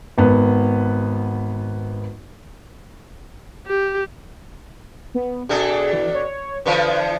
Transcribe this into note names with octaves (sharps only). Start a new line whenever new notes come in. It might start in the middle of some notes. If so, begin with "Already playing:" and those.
G#1 B3
G4
B3
B2 D4 G#4 A4
E3
C#5
D3 E3 F3 B4